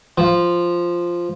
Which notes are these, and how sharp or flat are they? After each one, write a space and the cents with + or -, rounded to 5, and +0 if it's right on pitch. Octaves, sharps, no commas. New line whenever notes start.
F3 -5